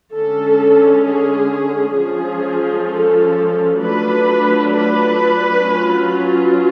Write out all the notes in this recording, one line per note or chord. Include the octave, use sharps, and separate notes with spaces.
D3 G#3 C#4 A4
G#4
F3 G#3 C#4 F4 G#4
A4
F#3 A3 D4 F4 B4
B4
F#3 C#4 F4